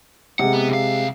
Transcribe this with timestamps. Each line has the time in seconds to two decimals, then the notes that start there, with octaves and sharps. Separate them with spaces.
0.39 C3 G#3 F#5
0.53 B3
0.69 C2 F5